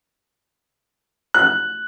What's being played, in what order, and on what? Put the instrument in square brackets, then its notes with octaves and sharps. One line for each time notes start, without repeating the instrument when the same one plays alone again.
[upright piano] F#6